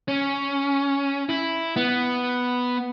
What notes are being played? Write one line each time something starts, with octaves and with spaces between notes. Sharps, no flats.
C#4
E4
B3